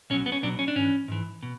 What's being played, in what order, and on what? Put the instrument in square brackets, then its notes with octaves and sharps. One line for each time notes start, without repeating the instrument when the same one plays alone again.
[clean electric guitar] B1 B2 F#3 C#4
B3
C#4
B1 B2 F#3 D4
C#4
D4
G#2 E3 C#4
G#2 E3
B2